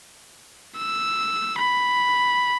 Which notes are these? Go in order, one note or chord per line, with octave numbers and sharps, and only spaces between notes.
E6
B5